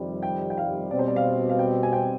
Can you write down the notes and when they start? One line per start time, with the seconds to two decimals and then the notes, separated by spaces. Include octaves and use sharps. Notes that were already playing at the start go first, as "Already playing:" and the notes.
Already playing: F2 C3 D#3 G3
0.23 G5
0.50 G5
0.58 F5
0.91 B2 G3 C4 D5
0.99 C5
1.08 D5
1.16 F5
1.50 F5
1.59 G5
1.83 G#5
1.93 G5